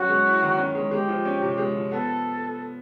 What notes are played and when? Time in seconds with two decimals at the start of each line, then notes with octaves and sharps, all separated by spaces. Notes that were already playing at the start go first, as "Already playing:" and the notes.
Already playing: F#3 C#4 F#4
0.09 G#3
0.25 E4
0.42 D#3
0.58 C#4
0.75 G#3
0.91 G#3 G4
1.08 F3
1.25 C#4
1.42 C3
1.58 G#3
1.75 F3
1.91 B3 A4